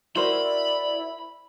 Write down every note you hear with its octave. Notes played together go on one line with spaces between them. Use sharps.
E4 F#4 A#4 C5 D5 B5